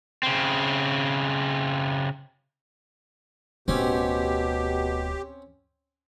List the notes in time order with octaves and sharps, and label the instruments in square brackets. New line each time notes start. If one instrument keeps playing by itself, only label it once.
[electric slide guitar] C#3 C4
[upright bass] D1 [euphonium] B2 [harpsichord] C4 C#4 [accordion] G4